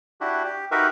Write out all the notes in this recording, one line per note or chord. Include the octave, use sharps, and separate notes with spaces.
D4 E4 F#4 G4
G4
D#4 F#4 G4 A#4 B4 E5